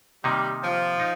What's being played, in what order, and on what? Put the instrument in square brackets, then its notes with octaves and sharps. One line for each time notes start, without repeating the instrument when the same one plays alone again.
[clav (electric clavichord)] C3 D#3 A#3 D#4 [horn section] G3
[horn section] F3
[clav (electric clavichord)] D#4